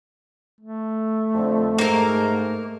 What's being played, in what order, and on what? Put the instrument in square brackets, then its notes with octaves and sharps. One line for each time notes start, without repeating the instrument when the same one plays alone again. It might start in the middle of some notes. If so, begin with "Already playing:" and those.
[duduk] A3
[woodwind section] F2 D3
[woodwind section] G#2 [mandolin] A#3 A#4